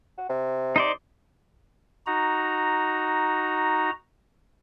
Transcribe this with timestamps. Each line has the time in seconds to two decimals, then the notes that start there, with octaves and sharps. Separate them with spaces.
0.18 F#4
0.29 C3
0.76 D#4 C5 D5
2.07 D#4 F#4 A#5